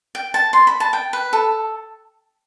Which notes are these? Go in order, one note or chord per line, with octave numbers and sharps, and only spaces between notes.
G5
A5
C6
B5
A5
G5
B4
A4